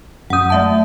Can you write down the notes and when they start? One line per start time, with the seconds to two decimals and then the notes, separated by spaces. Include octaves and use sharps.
0.30 F#2 F#5 D#6 G6
0.50 A3 E5 A5